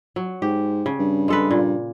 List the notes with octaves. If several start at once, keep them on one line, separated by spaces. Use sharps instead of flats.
F#3
G#2 G4
C#3
G2
G#3 A4 B4
A#2